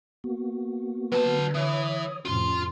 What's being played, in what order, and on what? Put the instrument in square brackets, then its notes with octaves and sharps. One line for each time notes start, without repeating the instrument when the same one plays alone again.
[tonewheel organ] A#3 B3 F#4
[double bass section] D3 [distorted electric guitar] F#3 A5 [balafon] B4
[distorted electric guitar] E3 [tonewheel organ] C#5 D#6
[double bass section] F2 A2 C3 [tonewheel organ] C#4 [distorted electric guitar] F4 C6